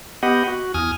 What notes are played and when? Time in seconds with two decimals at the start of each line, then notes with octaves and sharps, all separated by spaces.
0.23 B3 G4 D#5 F#5
0.47 F#4
0.74 E2 G#5 D#6 F6